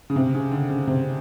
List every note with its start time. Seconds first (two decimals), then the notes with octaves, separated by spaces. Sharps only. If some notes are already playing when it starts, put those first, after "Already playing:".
0.10 C#3
0.16 C3
0.34 C#3
0.52 D3
0.69 C#3
0.87 C3